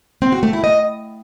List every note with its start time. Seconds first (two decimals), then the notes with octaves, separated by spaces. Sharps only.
0.22 C4
0.32 F#4
0.43 A3
0.53 E4
0.64 D#5